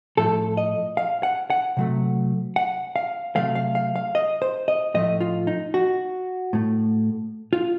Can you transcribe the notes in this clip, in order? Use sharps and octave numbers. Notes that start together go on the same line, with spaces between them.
A2 F3 A3 A4
D#5
F5
F#5
F#5
C3 F#3 A3
F#5
F5
C3 F#3 A3 F5
F5
F5
F5
D#5
C5
D#5
A2 F3 A3 D#5
F4
D#4
F#4
A2 A3
F4